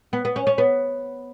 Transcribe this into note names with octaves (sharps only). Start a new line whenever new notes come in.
B3
B3
C#4
C#4
B3